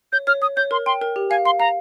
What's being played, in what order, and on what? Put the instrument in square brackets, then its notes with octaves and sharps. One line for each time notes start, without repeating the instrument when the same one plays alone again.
[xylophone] C#5 [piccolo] G6
[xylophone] C#5 [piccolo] F6
[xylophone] C#5 [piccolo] D#6
[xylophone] C#5 [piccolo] G6
[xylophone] A#4 [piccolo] C6
[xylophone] G5 [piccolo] C6
[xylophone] A#4
G4
[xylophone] F5 [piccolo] G#5
[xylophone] F5 [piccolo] C6
[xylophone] F5 [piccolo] A#5